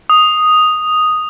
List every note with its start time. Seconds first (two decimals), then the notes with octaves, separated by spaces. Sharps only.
0.10 D#6